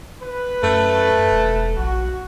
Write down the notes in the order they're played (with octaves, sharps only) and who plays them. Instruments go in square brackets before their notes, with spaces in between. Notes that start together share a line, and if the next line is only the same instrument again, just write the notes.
[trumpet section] B4
[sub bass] F#2 [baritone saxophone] A3
[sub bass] E1
[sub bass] A#1 [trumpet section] F#4